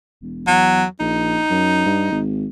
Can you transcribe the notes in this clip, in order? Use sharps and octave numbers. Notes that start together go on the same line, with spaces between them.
E1
E2 F#3
A#1 D#4
F#2
G2
G#1